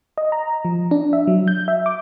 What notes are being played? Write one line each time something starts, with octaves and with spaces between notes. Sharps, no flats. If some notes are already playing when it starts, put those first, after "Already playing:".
D#5
A#5
F3
D4
E5
F#3
G6
E5
D6